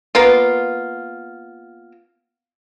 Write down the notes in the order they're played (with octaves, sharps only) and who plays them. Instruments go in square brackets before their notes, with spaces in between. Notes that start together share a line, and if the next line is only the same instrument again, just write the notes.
[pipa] A#3 B3 F4